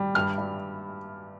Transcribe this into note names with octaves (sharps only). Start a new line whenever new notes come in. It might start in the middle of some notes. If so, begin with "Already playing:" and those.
Already playing: G3
G2 F6
G2